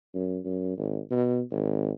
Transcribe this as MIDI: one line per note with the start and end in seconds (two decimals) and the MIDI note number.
0.14 0.38 42
0.45 0.76 42
0.78 0.99 32
1.11 1.41 47
1.51 1.91 32